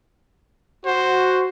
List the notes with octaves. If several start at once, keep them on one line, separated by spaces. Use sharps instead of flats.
F#4 C5